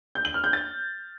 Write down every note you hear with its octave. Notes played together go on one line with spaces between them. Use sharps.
G6
F#7
F6
G6
A6